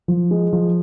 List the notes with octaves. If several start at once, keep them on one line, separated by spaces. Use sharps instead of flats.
F3
G#3
F3